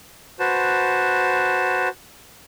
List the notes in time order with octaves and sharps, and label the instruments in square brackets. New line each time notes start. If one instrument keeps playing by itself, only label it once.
[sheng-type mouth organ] F#4 B4 C5 A5